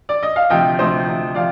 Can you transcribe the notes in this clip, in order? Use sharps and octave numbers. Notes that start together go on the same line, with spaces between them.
D5
D#5
F5
D2 C3 F3 D#5 G5
D2 C3 F3 C5 D#5
D2 C3 F3
C3 F3 D5 F5